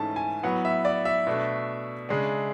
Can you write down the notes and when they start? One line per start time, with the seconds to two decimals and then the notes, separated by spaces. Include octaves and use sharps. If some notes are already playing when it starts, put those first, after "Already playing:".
Already playing: G#2 E3 A3 C#4 E4 A5
0.16 G#5
0.43 A2 F#3 B3 F#5
0.65 E5
0.85 D5
1.05 E5
1.27 B2 A3 D4
2.09 C#3 G#3 D4